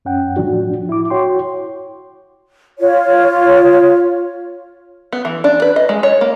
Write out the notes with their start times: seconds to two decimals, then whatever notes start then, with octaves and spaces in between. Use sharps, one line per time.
0.05 F#2 C#4 F#5 G5
0.37 A2 F3 D4 F#4
0.89 E4 D6
1.10 F#4 C#5 G5 C6
2.78 F4 C#5
5.13 B3
5.25 E3
5.44 D4
5.62 B4
5.76 D#5
5.89 G#3
6.03 C#5
6.21 A#3